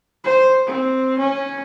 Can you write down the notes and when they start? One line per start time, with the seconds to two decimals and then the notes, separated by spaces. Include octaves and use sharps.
0.24 C5
0.67 C4
1.18 C#4